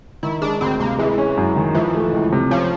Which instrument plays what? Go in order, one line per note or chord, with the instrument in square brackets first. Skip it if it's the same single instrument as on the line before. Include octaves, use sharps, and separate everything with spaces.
[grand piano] D#3 [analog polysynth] E4
[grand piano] G#3 [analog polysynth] D4
[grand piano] D2 [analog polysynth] C4
[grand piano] C3 [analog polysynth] A#3
[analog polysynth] E3 [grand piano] G#3
[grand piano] C#4
F#2
D#3
[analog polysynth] E3 [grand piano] F3
[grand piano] A3
C#2
C3
[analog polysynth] F3 [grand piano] C#4